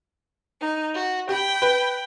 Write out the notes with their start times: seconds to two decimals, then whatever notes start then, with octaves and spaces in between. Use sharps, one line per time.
0.59 D#4
0.94 F#4
1.29 G4 G5 B5
1.62 B4